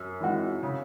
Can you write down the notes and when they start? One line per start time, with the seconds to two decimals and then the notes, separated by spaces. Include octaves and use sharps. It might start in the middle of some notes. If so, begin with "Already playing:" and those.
Already playing: F#2
0.21 E3 G#3 D#4 F#4
0.63 C#3